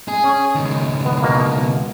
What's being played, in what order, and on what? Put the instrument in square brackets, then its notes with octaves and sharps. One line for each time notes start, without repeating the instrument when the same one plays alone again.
[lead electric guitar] G#4
[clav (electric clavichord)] C#4
[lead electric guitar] C#2 D#3
[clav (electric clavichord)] B3
B2 A#3